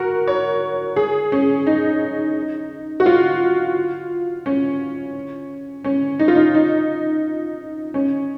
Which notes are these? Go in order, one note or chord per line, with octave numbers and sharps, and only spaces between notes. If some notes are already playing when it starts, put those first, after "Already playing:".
Already playing: F#4 A#4
C#5
G#4
C#4
D#4
F#4
F4
C#4
C#4
D#4
F4
D#4
D#4
C#4